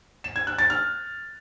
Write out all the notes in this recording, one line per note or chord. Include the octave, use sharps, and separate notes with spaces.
E7
G#6
F#6
A6
F6